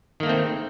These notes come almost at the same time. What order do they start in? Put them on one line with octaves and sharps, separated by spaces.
D#3 A#3 A3 C4